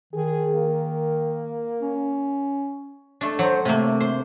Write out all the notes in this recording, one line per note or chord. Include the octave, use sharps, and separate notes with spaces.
D#3 G#4
A#3
C#4
A3 D4
F#3 C5
C3 A3 A#3
C5